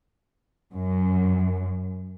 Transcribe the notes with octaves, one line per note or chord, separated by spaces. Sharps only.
F#2